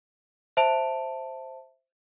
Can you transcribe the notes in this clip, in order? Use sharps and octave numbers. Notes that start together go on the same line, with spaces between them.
C5 E5 A5 D7 F7